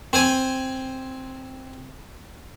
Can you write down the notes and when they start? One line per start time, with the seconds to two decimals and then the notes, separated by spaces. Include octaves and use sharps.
0.13 C4 C5 G#5